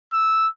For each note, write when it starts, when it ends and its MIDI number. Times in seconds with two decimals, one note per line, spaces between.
0.13 0.47 88